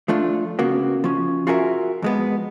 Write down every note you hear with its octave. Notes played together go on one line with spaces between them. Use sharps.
F3 A3 D4 F4
C#3 A#3 B3 F#4
F3 C#4
F4 F#4 G#4 A#4 E5
F2 G#3 B3